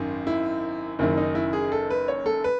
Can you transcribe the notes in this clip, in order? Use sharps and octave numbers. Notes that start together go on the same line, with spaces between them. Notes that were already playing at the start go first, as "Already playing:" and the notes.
Already playing: G#1 F#2 D#3
E4
F#1 F#2 D#3 E4
D#4
E4
G#4
A4
B4
C#5
A4
B4